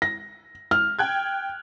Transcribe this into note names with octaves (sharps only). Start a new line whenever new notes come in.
A#6
F6
G5 F#6 G#6